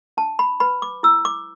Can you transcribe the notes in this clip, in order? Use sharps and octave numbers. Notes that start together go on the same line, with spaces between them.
D4 A5
B5
B4 B5
D6
E4 E6
D6